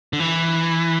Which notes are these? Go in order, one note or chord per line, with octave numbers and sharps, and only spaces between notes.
D3
E3